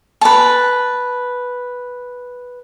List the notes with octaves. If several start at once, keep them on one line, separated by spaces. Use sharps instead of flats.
B4 A5